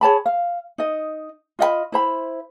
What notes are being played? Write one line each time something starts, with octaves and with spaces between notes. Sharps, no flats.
G#4 C#5 A5 B5
F5
D#4 D#5
F4 D#5 F#5 B5
E4 C5 B5